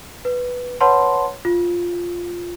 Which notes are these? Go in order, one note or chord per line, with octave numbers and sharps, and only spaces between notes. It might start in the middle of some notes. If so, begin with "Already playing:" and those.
B4
B4 C#5 F#5 A5 B5 C6
F4